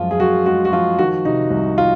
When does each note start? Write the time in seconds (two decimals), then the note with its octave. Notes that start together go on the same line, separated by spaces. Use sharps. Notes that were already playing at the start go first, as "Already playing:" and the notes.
Already playing: F#2 F3 G#3 F4
0.11 G#4
0.20 F#2 F#4
0.46 G#3 F#4
0.65 F#4
0.72 F3 F4
0.99 D#3 F#4
1.25 C3 D#4
1.51 C2
1.78 F4